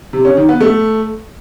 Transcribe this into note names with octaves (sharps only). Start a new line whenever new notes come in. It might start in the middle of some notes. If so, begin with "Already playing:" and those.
C3
C#4
D#3
B3
A3